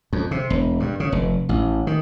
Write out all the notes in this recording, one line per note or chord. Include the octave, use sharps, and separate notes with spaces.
F2
C3
E1
G2
C#3
F1
A1
D#3